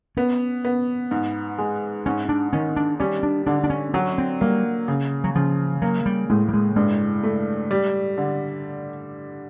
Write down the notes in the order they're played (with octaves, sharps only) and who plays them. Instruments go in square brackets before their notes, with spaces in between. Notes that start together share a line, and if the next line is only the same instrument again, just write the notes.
[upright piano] B3 [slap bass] C#4
[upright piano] B3
G#2
G#3
[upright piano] G#2 [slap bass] C#4
[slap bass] D4
[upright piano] D#3 [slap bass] C#4
[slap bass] D4
[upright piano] G3 [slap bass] C#4
[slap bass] D4
[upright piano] D3 [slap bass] D4
[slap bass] D4
C#4
[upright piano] F#3 [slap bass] C#4
[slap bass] C4
[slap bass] G3 [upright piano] A#3
[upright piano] C#3
[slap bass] F#3
[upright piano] C#3 [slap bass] F3
[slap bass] F#3 [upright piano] A#3
[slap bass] G3
[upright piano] A2 [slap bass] G#3
[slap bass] G3
G#3
[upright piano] G2 [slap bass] G#3
[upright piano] A3
G3
D3